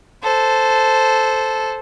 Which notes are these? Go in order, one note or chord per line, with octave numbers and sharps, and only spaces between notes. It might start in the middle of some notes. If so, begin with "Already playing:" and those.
A4 C5